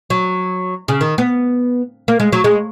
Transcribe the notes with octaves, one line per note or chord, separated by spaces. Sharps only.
F#3
C#3
D#3
B3
A#3
G#3
F#3
G#3